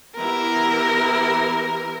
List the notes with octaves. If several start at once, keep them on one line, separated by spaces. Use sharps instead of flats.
E3 B3 E4 G4 A#4